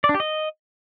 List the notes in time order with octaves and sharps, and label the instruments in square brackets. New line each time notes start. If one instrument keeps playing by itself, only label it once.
[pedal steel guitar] D5
D4
G4
D#5